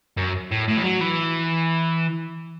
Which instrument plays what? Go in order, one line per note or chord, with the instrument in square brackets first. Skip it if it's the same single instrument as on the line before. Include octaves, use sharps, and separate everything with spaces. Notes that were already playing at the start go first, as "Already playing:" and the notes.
[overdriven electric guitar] F#2
A2
A2
E3
F#3
E3